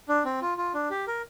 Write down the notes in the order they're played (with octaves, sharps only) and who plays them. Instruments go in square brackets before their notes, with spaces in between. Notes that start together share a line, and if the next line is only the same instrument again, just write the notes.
[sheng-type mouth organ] D4
C4
F4
F4
D4
G4
A#4